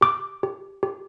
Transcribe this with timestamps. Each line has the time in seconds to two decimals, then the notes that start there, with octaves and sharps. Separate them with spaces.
0.01 G4 D6
0.43 G4
0.83 G4